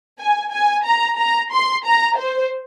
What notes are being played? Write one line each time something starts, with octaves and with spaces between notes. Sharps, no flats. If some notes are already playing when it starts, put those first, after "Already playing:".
G#5
G#5
A#5
A#5
C6
A#5
C5